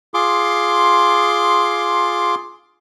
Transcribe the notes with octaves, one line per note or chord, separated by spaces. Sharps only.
F4 G#4 C6 D6